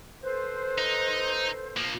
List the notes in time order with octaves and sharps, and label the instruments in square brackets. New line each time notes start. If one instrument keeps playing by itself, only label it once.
[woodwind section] A4 B4 C5
[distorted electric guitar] D#4
F3 A#3